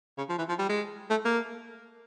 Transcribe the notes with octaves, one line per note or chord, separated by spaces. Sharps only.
C#3
F3
E3
F3
G3
G#3
A3
A#3